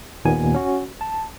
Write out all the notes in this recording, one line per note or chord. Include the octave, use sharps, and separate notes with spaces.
D#2 A#2 D#3 B3 G#5
C#4 F#4
A5